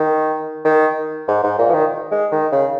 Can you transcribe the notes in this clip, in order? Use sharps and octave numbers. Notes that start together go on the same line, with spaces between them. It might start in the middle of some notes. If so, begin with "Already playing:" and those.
Already playing: D#3
D#3
G#2
G#2
A#2
F3
D#3
G#3
D#3
C#3